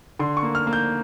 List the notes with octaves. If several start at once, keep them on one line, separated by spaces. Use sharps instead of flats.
D3 C6
C#6
A#3
F6
A#3
G6